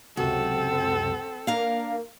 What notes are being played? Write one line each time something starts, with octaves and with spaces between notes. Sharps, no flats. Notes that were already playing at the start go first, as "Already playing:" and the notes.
C#2 F#2 C3 C4 F#4 A4
A#3 D4 A#4 F5